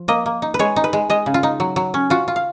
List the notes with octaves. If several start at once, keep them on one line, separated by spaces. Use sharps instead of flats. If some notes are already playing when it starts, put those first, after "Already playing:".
Already playing: F3
A#3 D#5
A#3
D#4
B4
G#3 C#5
D#4
B4
G#3
G#3 D#5
C#3
F4
D#4
F#3
F#3
C#4
F4 F#4
F4
F5